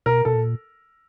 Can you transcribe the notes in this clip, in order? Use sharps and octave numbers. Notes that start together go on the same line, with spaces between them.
B2 A#4
B2 A4
A#2